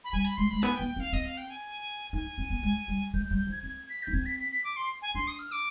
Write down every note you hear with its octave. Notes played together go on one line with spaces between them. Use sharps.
B5
G3 G#5
B5
G#3 C6
G#3 B5
B3 G#5
G5
B3
G5
C4
F5
C4 D#5
F5
G5
G#5
D#4 G#5
C4
B3
G#3
G3
G#3 G6
G6
G3
G6
F3
G#6
C4 G#6
B6
D4 G6
C4 G#6
B6
B6
B6
D6
C6
G#5
D4 C6
D#6
F6
D6